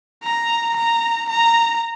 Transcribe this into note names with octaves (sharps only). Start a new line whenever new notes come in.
A#5
A#5
A#5